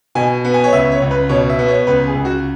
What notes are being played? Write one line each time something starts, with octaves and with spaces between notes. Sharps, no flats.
B2 G#5
B3
G#5
C#5
C#2 E5
C#5
C#2
B4
B2 C#5
E5
B3
C#5
C#2 B4
G#4
C#2
F#4